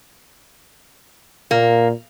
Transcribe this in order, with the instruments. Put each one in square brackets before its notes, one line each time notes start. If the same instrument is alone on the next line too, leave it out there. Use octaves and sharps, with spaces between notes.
[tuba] A#2 [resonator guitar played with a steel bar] A#3